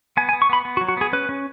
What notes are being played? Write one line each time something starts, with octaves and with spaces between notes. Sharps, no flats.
B3 G#5
G#5
B3
C#6
B3 B5
B3
F#4
F#3
F#4
B3 G#4
C#4 B4
C#4